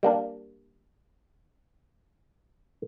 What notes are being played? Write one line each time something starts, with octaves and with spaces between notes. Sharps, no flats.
G3 A#3 D4